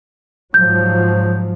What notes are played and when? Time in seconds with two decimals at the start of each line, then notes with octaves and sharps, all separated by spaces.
0.54 G#2 F3 F#3 G6